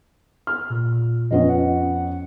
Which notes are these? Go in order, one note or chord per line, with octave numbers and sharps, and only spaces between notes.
F6
A#2
F2 B3 C#4 D#5
F#5